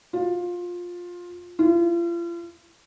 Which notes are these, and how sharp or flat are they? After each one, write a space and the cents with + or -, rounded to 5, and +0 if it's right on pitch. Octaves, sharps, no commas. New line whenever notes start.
F4 +15
F4 -40